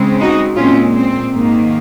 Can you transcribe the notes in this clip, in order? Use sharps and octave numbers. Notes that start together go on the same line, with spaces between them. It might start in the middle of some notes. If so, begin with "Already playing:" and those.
Already playing: C#3 G#3 C4
D#4 F#4
A#2 G#3 C4 C#4 F4
C4
G#2 D#3 A#3